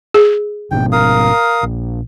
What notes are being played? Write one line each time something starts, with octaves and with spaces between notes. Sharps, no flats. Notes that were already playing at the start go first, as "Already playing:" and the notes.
G#4
G#1 G#2 B2 G5
A#4 F5 D#6
A#1